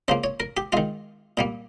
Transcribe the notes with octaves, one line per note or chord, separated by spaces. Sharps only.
C#3 F3 A#3 C5
C#5
A#4
G4
D#3 G#3 F4
A#2 G3 A#3